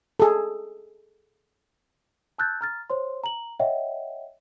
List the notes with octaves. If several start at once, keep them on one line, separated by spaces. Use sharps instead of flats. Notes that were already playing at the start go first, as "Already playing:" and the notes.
G#4 A4
A5 E6 F#6 G6 A6
A#5 F6 A6
C5 C#5 C6
A#5 F#7
C#5 D#5 E5 F#5 G5